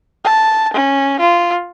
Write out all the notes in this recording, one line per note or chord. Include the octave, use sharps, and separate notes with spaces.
A5
C#4
F4